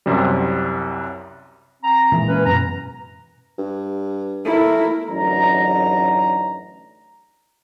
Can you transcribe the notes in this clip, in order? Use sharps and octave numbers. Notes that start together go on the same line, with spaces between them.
C2 F#2 C3 G3
C4 A#5
A#2 E3 G#3
C#4 B4
F#2 B2 A#5
G2
A3 E4 A#4
A1 F#2 D3 D#4 A#5